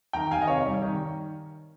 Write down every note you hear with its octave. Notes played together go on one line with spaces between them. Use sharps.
D#3 G5 A#5
D#3 F5 G#5
D#5
C3 C#5 F5
G3
D#3